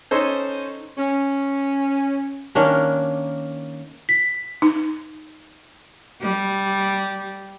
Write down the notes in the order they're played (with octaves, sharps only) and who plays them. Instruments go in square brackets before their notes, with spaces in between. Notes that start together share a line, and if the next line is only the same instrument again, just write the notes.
[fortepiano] C#4 D#4 A4 C5
[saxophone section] C#4
[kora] D#3 A#3 C#4 D4
[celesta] B6
[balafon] D#4
[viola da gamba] G3